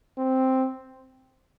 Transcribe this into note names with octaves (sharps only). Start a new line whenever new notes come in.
C4